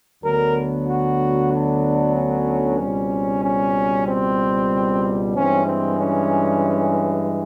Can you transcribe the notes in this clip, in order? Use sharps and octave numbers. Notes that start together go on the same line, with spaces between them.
D2 D3 F#3 B3 A#4
F#4
D4
C#4
C#2 B2 G3 C4
C#4
C4
G2 E3 G#3 C4 C#4
C4
C#4